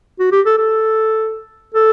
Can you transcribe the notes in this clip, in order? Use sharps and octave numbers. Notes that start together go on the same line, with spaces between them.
F#4
G4
A4
A4
A4